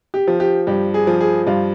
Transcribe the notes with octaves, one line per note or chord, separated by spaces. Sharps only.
G4
F3
G4
G2 G4
G#4
F3
G#4
G2 F4